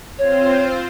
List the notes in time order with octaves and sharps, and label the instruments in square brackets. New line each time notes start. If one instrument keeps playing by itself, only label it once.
[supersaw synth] C4 F4 C5 [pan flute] C#5